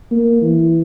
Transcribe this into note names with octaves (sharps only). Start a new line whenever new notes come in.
A#3
E3